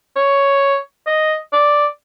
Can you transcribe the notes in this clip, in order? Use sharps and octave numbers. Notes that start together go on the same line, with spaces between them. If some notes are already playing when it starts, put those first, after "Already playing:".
C#5
D#5
D5